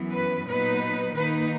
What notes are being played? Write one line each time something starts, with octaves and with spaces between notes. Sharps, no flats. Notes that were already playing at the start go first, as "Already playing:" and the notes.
Already playing: F#2 E3 B3
B4
A#2 F#3 B3 D#4 B4
D#3 A#3 D#4 B4